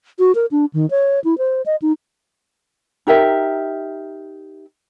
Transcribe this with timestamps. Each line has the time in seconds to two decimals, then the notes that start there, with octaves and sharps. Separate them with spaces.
0.19 F#4
0.35 A#4
0.51 D4
0.74 D#3
0.91 C#5
1.24 E4
1.38 C5
1.66 D#5
1.82 D#4
3.07 D#4 G4 A#4 E5